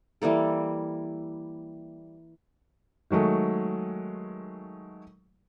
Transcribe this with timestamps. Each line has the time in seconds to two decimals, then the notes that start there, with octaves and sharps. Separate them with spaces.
0.22 E3 G3 A#3 A4
3.11 D#3 F#3 G#3 A3